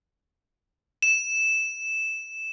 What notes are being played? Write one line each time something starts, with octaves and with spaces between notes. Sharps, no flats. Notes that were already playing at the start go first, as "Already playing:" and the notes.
E7